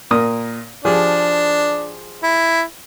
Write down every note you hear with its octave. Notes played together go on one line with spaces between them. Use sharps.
A#2 A#4 D#6
F3 D4 G4 G#4
E4